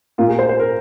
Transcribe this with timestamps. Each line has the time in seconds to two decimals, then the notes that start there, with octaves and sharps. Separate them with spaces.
0.18 A#2 A#3 F4
0.28 G#4
0.39 C5
0.49 C5
0.60 A#4